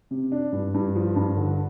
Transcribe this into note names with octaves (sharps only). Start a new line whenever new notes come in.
C3
D4
G2
G2
F3
G2
D3